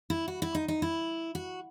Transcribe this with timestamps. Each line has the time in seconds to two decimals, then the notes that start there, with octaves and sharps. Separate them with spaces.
0.10 E4
0.28 F#4
0.42 E4
0.55 D#4
0.68 D#4
0.82 E4
1.35 F#4